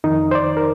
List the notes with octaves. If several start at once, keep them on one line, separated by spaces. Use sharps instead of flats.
F2 D#3 D#4
C5
D5
A#4